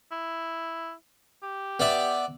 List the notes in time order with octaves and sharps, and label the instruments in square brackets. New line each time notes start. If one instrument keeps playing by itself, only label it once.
[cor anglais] E4
G4
[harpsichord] B3 D5 E5